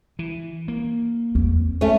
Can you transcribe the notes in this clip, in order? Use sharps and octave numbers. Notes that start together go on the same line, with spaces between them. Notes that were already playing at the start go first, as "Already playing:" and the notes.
E3
A#3
E2 C4
A3 C#4